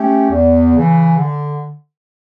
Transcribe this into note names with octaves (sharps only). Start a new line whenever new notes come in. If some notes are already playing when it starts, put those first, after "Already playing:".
Already playing: A3 C#4 G4
E2
C#3 E3
D3